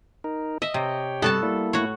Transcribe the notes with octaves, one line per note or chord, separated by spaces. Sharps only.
D#4 A#4
D#5 E5
C3 G4 C#5 G5
G2 C3 B3 F#4 A4 A5
G3 A#3 E4
A2 F#4 C#5